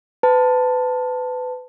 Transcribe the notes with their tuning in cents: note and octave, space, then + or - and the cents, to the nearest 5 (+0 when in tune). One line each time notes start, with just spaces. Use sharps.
B4 +30 A5 +10